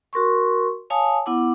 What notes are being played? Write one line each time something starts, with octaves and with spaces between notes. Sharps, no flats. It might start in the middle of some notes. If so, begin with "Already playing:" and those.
F#4 A#4 C6 C#6
C#5 F5 G#5 A5 D#6
B3 E4 F#5 D6